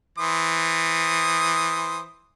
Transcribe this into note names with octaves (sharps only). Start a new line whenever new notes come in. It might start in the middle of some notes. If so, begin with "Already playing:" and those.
E3 C5 D#6